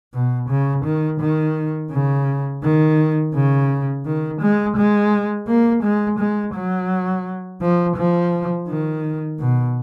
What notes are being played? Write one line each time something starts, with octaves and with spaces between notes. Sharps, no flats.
B2
C#3
D#3
D#3
C#3
D#3
C#3
D#3
G#3
G#3
A#3
G#3
G#3
F#3
F3
F3
D#3
B2